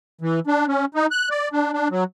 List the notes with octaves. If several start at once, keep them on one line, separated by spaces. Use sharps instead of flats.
E3
D4
C#4
D#4
F#6
D5
D4
D4
F#3